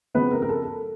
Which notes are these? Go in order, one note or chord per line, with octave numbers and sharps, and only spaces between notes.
C#3 F3 G#3 B3 C4 B4
A#4
A#4
A4
A4